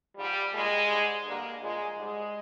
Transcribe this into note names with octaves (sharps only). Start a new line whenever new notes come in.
G#2 F3 G3
A#2 G3 G#3
G#2 G3
G2 D3 G3 A#3
A#2 F3 G#3
G#2 G3 G#3